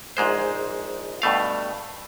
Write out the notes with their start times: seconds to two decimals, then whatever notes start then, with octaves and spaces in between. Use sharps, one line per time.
0.17 A#1 G#2 G#3 C5
1.22 G2 B2 A3 F5